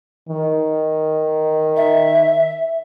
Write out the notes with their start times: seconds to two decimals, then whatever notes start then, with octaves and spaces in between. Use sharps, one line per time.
0.29 D#3
1.76 E5